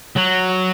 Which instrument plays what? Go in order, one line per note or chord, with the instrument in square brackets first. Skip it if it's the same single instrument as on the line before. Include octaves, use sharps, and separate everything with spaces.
[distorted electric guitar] F#3